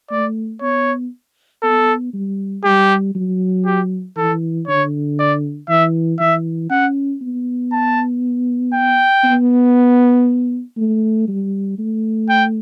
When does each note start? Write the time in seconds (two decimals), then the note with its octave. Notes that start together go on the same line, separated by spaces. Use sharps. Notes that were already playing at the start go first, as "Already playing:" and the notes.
0.11 A3 D5
0.62 B3 C#5
1.63 B3 A4
2.13 G3
2.64 G3 G4
3.15 F#3
3.66 G4
4.17 E3 A4
4.68 D3 C#5
5.19 D5
5.69 E3 E5
6.20 E3 E5
6.70 C#4 F#5
7.22 B3
7.72 A5
8.74 G5
9.24 B3
10.77 A3
11.28 G3
11.79 A3
12.29 G5